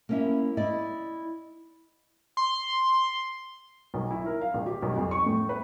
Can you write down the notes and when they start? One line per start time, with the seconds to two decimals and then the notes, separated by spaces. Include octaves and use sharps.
0.09 A#3 C#4 E4
0.57 E4 D5 D#5
2.37 C6
3.94 B1
4.11 E4
4.26 A#4
4.41 F5
4.54 A#1
4.66 G4
4.82 B1
4.96 F2
5.11 C#6
5.26 A2
5.49 B4